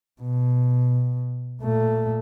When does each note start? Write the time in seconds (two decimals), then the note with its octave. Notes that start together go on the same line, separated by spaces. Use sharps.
0.22 B2
1.62 A#2 A3